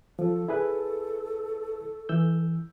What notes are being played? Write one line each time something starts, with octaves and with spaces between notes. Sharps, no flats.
F3 A4
E4 G#4 B4
E3 E6 G6